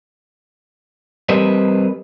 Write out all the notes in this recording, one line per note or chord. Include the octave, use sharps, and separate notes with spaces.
G3 C4 A#4 B4 D#5